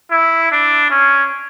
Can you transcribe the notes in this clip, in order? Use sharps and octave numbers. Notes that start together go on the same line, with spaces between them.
E4
D4
C#4